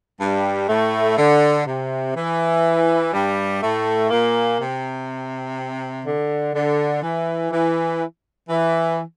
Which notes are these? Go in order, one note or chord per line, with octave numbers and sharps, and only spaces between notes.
G2 G3
A2 A3
D3
C3
E3
G2 G3
A2 A3
A#2 A#3
C3
D3
D3
E3
E3
E3